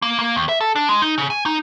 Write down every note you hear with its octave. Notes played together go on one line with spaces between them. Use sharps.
A#3
A#3
D#2
E5
A4
D4
G#3
D#4
C#3
G#5
D#4